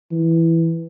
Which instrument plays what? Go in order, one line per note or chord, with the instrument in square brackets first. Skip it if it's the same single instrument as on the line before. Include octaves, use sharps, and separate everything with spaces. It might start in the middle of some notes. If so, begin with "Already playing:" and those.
[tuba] E3